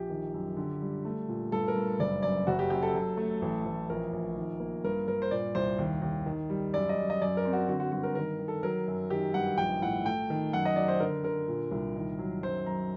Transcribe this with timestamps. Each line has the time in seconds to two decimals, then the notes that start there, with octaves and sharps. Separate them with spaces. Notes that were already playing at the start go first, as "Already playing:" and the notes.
Already playing: A#1 G4
0.10 D#3
0.34 F#2
0.57 D3
0.81 G3
1.05 A3
1.29 A#2
1.52 G2 A4
1.68 A#4
1.75 G2
1.99 F#1 D5
2.22 F#2 D5
2.47 F#1 F#4
2.59 G4
2.70 F#2 G4
2.83 A4
2.95 F#3
3.17 A3
3.42 A1
3.65 A1
3.90 A#1 A#4
4.13 A#1
4.36 D#3
4.60 A#3
4.84 G2 A#4
5.08 G2 A#4
5.22 C5
5.31 A#2 D5
5.55 C2 C5
5.78 D#2
6.02 D#2
6.26 D#3
6.50 G3
6.73 F#2 D5
6.89 D#5
6.97 F#2
7.10 D#5
7.21 F#2 D5
7.37 A#4
7.45 C4
7.53 F#4
7.68 D3 F#4
7.80 F#4
7.92 G2 F#4
8.03 A#4
8.15 D#3 A#4
8.39 D#3
8.48 A4
8.63 F#3 A#4
8.87 F#2
9.10 D#3 G4
9.34 G2 F#5
9.58 A#1 G5
9.82 A2 F#5
10.05 A3 G5
10.30 D#3
10.53 F#2 F#5
10.65 D#5
10.76 F#3 D5
10.88 C5
11.00 D3 A#4
11.24 D3 A#4
11.48 A#2
11.71 C2
11.96 D#3
12.19 F#3
12.43 F#2 C5
12.66 F#2 A#5